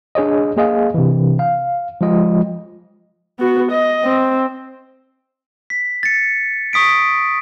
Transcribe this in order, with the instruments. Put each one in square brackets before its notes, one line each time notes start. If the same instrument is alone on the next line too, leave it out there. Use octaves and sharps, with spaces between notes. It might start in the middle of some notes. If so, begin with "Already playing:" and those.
[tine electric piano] D4 G#4 C#5 D#5
A#3 G#4 D#5 F5
C3 E3
F5
F3 G#3 F4 D#5
[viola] B3 F#4
D#5
C4
[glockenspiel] B6
A6 C#7
C#6 D#6 B6 D7